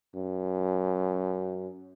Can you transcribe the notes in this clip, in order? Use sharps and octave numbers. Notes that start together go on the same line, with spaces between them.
F#2